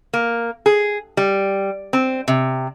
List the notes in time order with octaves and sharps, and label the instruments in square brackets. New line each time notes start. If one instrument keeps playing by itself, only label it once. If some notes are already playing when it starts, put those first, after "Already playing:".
[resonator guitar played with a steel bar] A#3
G#4
G3
C4
C3